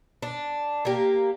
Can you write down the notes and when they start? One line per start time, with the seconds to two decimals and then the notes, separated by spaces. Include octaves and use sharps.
0.23 D4
0.85 A#3 G4